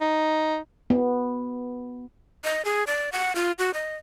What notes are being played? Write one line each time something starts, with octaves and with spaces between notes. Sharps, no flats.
D#4
B3
D#5
G#4
D5
F#5
F4
F#4
D#5